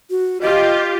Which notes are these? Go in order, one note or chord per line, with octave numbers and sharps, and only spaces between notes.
F#4
F4 G4 D#5